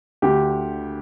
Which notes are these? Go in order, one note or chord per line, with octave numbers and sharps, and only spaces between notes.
D2 D3 G4